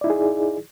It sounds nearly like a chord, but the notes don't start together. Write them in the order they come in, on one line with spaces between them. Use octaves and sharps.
D5 E4 D#4 G#4